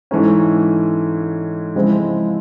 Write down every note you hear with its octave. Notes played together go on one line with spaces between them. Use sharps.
G#2 E3 A3 C#4
C#3 F3 G#3 C4 E4